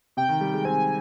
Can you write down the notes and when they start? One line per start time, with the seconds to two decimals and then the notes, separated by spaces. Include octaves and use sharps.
0.17 C3 G5
0.29 D#3
0.41 G3
0.53 G#3
0.65 C4 G#5